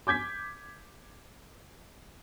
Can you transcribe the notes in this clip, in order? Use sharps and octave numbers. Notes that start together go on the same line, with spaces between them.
D6 G6 G#6 B6